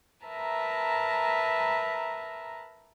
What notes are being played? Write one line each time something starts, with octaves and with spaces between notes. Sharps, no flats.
A#4 B4 E5 A5 A#5